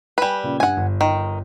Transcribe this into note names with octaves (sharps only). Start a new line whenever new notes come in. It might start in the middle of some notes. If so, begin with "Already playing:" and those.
G3 B4 G5 G#5 E7
A#2 C#3
G2 F#5 G#5
G1
D#3